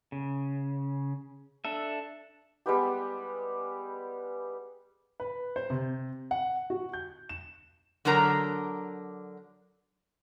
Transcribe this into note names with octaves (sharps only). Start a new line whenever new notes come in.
C#3
D4 A4 E5
G3 G#3 B3 G4
B4
C5
C3
F#5
F#4
G6
E7
D3 F#3 D4 A#4 A#5